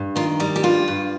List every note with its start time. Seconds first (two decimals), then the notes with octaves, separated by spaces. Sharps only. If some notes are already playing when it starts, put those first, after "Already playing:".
Already playing: G2
0.16 D#3 F4
0.40 G3 D#4
0.56 G4
0.63 G2 F4
0.88 G2